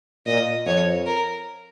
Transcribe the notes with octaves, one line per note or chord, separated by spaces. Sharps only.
A#2 D#5
F2 C#5
A#4